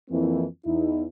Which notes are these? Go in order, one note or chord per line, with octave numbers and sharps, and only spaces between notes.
F2 E3 F3 A#3 C4 E4
E2 D#4 E4